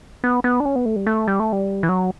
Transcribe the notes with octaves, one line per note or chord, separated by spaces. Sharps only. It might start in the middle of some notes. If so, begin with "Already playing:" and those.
B3
B3
D4
C#4
B3
A3
G3
A3
G3
A3
G3
E3
F#3